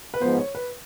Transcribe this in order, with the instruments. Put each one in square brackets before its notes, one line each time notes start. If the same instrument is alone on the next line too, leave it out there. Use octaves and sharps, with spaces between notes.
[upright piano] B4
[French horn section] G#2 F3 G#3 B3 [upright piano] C5
[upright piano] C#5
B4